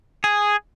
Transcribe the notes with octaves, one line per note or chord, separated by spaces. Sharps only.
G#4